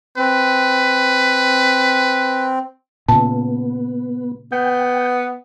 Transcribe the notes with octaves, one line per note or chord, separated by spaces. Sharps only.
C4 B4
A#2 C#3 B3 A5
B3 G5